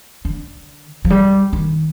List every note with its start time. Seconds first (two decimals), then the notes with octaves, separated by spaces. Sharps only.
0.25 D3
1.05 F3
1.10 G3
1.53 D#3